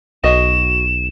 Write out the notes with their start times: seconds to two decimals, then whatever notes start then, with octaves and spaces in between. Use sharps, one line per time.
0.24 B1 F#4 D#5 E7